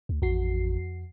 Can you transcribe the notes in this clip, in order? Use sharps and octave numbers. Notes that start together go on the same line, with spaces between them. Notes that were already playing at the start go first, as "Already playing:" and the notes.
D2
A1 F2 F#4 C7